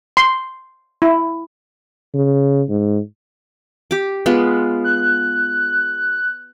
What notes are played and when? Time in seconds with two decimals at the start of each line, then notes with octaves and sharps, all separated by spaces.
0.17 C6
1.02 E4
2.14 C#3
2.69 G#2
3.91 G4 D6
4.26 G#3 B3 F4
4.84 F#6